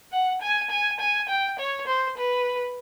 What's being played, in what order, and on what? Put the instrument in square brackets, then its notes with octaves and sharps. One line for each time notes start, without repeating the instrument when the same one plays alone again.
[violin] F#5
G#5
G#5
G#5
G5
C#5
C5
B4